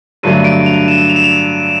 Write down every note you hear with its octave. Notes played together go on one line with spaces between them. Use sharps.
G2 D3 F#3 A3 D#7
D7
F7
E7
F7
E7
F7